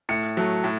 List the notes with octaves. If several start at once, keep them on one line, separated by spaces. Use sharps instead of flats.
A2 C#7
F#3 A3
A2